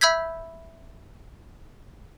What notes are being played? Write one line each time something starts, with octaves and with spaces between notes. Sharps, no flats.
E5 B5 E6 G6 G#6 B6